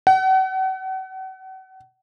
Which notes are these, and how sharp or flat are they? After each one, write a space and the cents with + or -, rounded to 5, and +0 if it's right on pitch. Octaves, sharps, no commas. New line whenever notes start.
F#5 +40